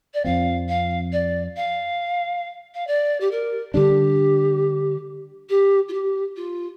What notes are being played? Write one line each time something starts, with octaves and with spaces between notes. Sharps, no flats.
D5
F2 F3 C4 F5
F5
D5
F5
F5
D5
G4
A#4
D3 G3 D4 G4
G4
F4
G4
F4